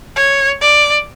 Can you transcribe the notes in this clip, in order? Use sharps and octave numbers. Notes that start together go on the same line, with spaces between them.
C#5
D5